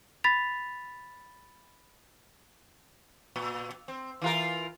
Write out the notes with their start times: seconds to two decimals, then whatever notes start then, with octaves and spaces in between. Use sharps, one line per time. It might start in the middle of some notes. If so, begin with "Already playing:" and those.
0.24 B5 A6 B6 F7
3.36 A#2
3.88 C4
4.22 E3 F4 A#4